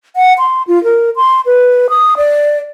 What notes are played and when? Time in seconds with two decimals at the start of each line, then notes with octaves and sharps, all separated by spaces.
0.16 F#5
0.38 C6
0.68 F4
0.84 A#4
1.16 C6
1.46 B4
1.90 D#6
2.17 D5